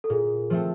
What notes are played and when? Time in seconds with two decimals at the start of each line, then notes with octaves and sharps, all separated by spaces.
0.04 A4
0.10 A#2 G#4
0.50 F3 A3 C4